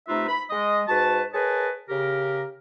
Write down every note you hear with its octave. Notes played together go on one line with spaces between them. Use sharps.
C3 A3 D#4 F4 B4 E5
B5
G#3 D#5
G#2 F#4 B4 A5
G#4 A#4 B4 C#5 D#5 A5
C#3 G4 A#4